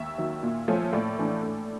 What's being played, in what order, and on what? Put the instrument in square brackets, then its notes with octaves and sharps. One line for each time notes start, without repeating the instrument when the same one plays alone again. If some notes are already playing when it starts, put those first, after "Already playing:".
Already playing: [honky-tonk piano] D#2 E5
D#3 F#3
A#2
F3 A3 C#4
A2 D5
E3 A3 D4
A2